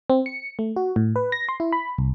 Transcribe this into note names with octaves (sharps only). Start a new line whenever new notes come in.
C4
C#7
A3
F#4
A2
B4
A#6
C6
E4
B5
C2